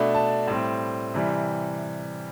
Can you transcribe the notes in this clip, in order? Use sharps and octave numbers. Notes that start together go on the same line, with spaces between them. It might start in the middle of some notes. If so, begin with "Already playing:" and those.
Already playing: B2 A3 D4 B5
A5
A2 G3 C4
C3 E3 G3